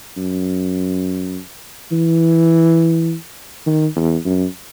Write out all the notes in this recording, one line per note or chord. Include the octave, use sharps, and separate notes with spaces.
F#2
E3
D#3
E2
F#2